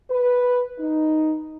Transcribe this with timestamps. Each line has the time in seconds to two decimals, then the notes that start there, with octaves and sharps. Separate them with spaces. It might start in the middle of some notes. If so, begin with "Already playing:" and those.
0.10 B4
0.79 D#4